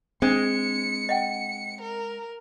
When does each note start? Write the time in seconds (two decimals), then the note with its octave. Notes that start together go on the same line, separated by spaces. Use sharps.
0.22 G#3 C4 D4 C#7
1.09 D#5 F#5 G5
1.81 A#4